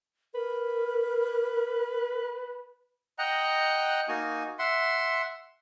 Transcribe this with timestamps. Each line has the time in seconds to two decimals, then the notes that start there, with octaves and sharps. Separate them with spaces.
0.35 A#4 B4
3.18 D#5 F#5 G5 A#5 F#6
4.08 A#3 D#4 F#4 G#5
4.59 E5 F#5 C6